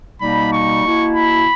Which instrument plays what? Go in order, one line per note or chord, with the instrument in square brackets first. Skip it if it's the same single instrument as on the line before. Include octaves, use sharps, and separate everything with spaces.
[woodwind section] B2 G3 A#3 D#4 [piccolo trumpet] B5
[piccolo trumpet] C#6
[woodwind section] B2 A#3 E4
[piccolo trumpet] B5